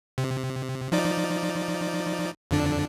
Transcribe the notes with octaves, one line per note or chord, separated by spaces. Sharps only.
C3
F3 D#4 D5
F2 D3 D4